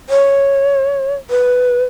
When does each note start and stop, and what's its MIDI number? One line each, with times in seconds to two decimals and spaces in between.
0.10 1.15 73
1.30 1.86 71